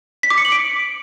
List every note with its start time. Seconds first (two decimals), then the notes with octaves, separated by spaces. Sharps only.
0.23 B6
0.30 D6
0.38 C#7
0.45 F#7
0.52 D7